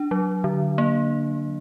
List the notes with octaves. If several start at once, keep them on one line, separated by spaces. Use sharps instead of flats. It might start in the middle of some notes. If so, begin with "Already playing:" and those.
Already playing: D4
F#3
D3
A#3